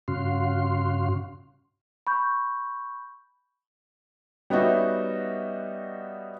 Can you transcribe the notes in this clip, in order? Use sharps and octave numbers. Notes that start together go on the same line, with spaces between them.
G2 C#3 C#4 F#4 F5 C6
B5 C#6 G6
G3 B3 C#4 D#4 F#4 E5